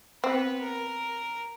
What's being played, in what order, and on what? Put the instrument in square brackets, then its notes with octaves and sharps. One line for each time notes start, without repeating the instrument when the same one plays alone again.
[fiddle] B3 B4 [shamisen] C4
[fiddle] A#4